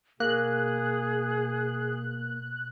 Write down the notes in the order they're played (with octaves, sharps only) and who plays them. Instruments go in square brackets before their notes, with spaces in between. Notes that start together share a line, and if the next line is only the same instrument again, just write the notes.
[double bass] B2 [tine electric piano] A#3 [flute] G#4 [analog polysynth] F#6